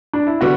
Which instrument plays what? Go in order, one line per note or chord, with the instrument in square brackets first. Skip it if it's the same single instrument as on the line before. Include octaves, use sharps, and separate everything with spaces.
[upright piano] D4
E4
[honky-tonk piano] D3 G3 B3 [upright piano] F#4